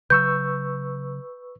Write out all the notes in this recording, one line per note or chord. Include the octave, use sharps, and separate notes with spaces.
C#3 F#3 B4 C#6 E6 G6